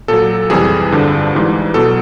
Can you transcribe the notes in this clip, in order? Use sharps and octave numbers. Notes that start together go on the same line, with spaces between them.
A#2 F#3 A4
F2 C3 E3 G3 G#4
G2 D3 F3
G#2 E3 G3
B2 A4
F#3